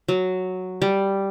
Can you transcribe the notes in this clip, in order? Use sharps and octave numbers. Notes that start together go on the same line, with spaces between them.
F#3
G3